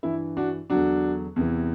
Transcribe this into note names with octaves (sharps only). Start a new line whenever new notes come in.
G2 E3 E4
D4 F#4
E2 D3 F#3 D4 F#4
E2 C3 E3